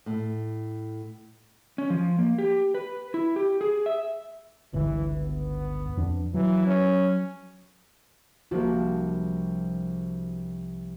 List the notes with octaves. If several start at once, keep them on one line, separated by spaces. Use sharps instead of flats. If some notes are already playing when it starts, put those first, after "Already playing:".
A2
C#4
F3
A#3
G4
B4
E4
G4
G#4
E5
G1 C#2 E3
B3
F2 D4
E3 F#3
C#4
C2 F3 A#3 D4 F#4